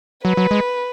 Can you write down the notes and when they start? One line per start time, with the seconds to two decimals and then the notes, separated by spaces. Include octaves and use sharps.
0.25 F#3 B4
0.37 F#3
0.51 G#3